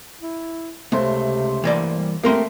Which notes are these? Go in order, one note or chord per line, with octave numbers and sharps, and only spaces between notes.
E4
C#2 C3 A3 C5
E3 A#3 D5
G3
A3 A#3 C4 G4 A#4 C6